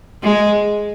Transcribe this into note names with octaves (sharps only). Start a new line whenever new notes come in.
G#3